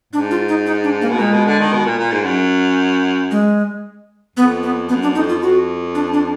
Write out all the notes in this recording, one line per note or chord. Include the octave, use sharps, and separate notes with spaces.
G#2 D4
F4
D#4
D#4
D4
A#3
B2
A#2 G#3
B2
D3
D#3
B2
A#2
A#2
G#2
F#2
G#3
F2 B3
B3
F#2 B3
D4
F2 D#4
F4
F2 F#4
D4
D4